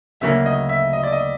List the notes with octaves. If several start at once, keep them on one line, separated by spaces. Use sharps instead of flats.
D2 C#3 F#3 A#3 C#4 E5
D#5
E5
D#5
D5
D#5